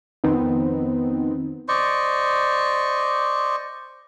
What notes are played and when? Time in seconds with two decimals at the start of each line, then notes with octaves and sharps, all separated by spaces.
0.24 F2 D#3 B3 C4 D#4
1.68 C5 D5 D#5 C#6